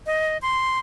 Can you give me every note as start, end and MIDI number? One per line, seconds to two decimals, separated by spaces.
0.06 0.38 75
0.42 0.79 84